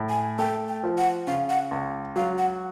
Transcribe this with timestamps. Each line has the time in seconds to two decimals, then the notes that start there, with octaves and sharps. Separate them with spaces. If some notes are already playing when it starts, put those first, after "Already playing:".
Already playing: A2
0.09 G#5
0.39 A3 G5
0.68 G5
0.84 F3
0.98 F#5
1.27 C#3 F5
1.49 F#5
1.71 C#2
2.16 F#3 F5
2.38 F#5